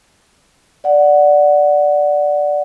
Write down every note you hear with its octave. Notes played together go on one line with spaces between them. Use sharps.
D5 F#5